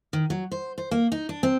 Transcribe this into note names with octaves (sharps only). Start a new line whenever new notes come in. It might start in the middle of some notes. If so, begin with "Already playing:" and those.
D#3
F#3
C5
C5
A#3
D#4
D4
C4